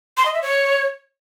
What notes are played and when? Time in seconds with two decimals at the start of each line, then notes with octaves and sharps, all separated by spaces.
0.17 C6
0.26 D#5
0.34 E5
0.42 C#5